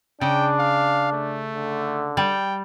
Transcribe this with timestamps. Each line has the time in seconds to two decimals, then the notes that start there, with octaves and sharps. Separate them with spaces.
0.21 C#3 D4 G5
0.59 F5
1.12 A3
1.54 D3
2.17 G3 G5